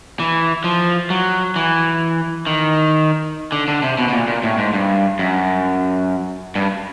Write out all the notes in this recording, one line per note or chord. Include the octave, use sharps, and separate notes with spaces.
E3
F3
F#3
E3
D#3
D3
D3
C3
B2
B2
A#2
A#2
A2
G#2
G2
F#2
G2